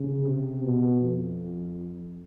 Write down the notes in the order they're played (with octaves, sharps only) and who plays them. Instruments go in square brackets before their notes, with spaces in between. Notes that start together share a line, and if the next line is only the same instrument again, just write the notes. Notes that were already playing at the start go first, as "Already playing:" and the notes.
Already playing: [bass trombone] C#3
C3
B2
F2